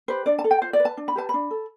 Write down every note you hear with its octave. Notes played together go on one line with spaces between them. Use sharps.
G4 B4 C5
D4 D5
A5
A4
G5
F4 C5
D5
B4
A5
D4
B5
G4 B4 A5
D4 B5
A4